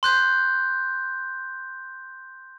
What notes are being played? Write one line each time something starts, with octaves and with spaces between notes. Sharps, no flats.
C6 F#6 G6